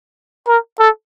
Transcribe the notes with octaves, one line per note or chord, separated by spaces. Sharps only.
A#4
A4